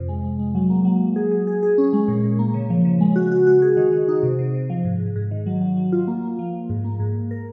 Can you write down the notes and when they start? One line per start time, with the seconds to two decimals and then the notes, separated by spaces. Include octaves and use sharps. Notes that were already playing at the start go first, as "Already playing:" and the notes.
Already playing: F2 C3
0.08 G#3
0.24 G#3
0.39 G#3
0.55 F#3
0.70 A#3
0.85 F#3
1.01 F#3
1.16 G#4
1.31 G#4
1.47 G#4
1.63 G#4
1.78 C#4
1.93 G#3
2.08 A#2
2.24 A#2
2.39 A#3
2.54 C#3
2.70 F3
2.85 C#3
3.01 G#3
3.16 F#4
3.32 F#4
3.47 F#4
3.62 G#4
3.77 D#3
3.93 D#3
4.08 D#4
4.23 C3
4.39 C3
4.54 C3
4.70 F3
4.85 G#2
5.00 G#2
5.16 G#2
5.31 D#3
5.46 F#3
5.61 F#3
5.77 F#3
5.92 F4
6.08 A#3
6.23 A#3
6.39 F3
6.53 F3
6.70 G#2
6.85 A#3
7.00 G#2
7.15 G#2
7.31 A#4